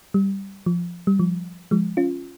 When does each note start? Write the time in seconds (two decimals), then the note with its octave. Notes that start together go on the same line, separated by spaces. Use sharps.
0.14 G3
0.66 F3
1.07 G3
1.19 F3
1.71 F3 G#3
1.97 C#4 F4